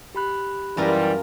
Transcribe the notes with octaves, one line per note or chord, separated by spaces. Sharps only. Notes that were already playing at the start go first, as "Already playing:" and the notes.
G4 B5 F#6
F#2 E3 G3 F4 A#4